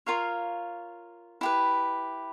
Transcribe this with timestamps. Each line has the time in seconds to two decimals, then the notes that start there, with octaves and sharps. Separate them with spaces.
0.06 F4 A#4 C#5 F5
1.41 E4 G4 B4